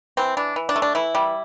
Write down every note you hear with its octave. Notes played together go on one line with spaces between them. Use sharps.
E3 C4
E3 D4
E3
D4
A3
D4
E3 E4
G3